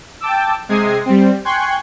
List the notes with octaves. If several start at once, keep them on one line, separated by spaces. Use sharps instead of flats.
G5 A5 D6 E6
C3 G#3 D#6 G#6 C7
G3 C4
G5 G#5 C6 C#6 F#6 G#6